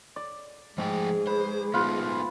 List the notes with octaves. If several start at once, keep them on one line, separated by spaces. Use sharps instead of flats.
D5
G#2 F3 G#3 A3 G#4 G5
B4 C5
A3 B3 D#4 F4 B4